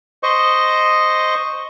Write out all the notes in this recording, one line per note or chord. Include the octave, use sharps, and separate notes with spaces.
C5 D#5 C#6